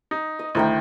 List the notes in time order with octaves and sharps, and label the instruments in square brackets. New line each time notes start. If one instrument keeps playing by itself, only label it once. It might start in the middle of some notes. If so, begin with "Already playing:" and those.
[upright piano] D#4
[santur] D#5
[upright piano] D2 D#3 [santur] E4 A#4 G5